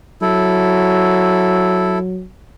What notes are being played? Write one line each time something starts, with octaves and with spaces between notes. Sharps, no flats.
F#3 E4 A4